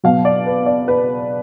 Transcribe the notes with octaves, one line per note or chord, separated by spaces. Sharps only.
B2 F#3 F5
D5
B4
D5
B4